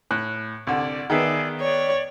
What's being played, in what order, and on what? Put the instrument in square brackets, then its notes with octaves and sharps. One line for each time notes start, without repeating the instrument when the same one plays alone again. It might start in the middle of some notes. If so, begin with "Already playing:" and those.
[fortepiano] A2 F#6
[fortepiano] C2 D3 [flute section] D5
[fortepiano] D#3 B3 B4 [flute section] G#4 D5 E5
[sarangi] C#5 [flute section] D5